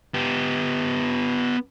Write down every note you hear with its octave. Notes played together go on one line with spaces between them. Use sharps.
B3 G4